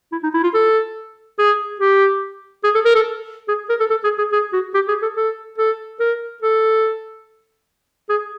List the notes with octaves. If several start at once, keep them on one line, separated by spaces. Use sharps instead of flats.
E4
D#4
E4
F4
A4
G#4
G4
G#4
A4
A#4
A4
G#4
A#4
A4
A4
G#4
G#4
G#4
F#4
G4
G#4
A4
A4
A4
A#4
A4
G#4